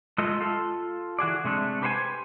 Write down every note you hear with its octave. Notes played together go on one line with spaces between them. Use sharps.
G#3 A3 F4 A4 D#5
F4 A4
E3 F#4 G#4 D5
C3 G#3 A3 D4
G4 B4 C5 F#5 G#5